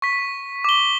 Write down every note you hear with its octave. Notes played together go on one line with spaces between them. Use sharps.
C#6 B6
D6 G7